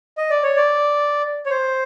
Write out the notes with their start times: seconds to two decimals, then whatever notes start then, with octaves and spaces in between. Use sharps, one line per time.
0.18 D#5
0.30 D5
0.43 C#5
0.56 D5
1.46 C#5
1.50 C5